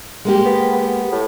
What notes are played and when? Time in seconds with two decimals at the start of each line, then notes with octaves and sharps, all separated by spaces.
0.25 G#3 A#3 G4
0.45 B3
0.72 B3
1.12 A2